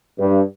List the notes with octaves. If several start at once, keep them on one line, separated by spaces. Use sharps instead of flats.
G2